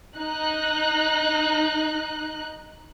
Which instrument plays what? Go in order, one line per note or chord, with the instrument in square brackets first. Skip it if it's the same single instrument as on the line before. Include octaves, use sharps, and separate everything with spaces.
[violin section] D#4 F#6